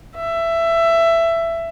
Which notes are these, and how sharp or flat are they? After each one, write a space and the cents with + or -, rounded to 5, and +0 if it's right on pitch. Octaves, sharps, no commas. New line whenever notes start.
E5 +15